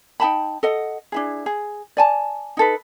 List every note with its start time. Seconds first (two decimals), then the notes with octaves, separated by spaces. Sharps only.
0.20 D#4 G5 A5 B5
0.63 A4 D#5 F#5
1.12 D4 E4 G#4
1.46 G#4
1.97 D5 G#5 A5
2.57 D#4 A4 B4